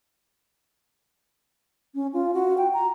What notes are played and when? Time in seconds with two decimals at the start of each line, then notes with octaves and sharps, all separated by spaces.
1.95 C#4
2.13 F4
2.34 F#4
2.58 G5
2.74 A#5